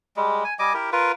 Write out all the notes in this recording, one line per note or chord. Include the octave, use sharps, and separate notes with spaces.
G3 G#3
G#5
G3 D#5 G#5 D6
E4 G4 A#4
F4 A#4 B4